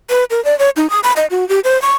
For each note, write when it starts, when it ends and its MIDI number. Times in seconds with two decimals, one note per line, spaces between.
0.10 0.24 71
0.30 0.43 70
0.45 0.57 74
0.59 0.70 73
0.76 0.89 63
0.90 1.00 87
1.03 1.13 83
1.16 1.26 75
1.30 1.47 66
1.49 1.60 67
1.64 1.80 72
1.82 1.96 85